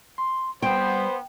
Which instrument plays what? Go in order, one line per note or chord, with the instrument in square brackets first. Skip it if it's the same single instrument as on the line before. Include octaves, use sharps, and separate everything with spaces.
[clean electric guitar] C6
[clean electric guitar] G3 [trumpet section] B3 C5 [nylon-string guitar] G5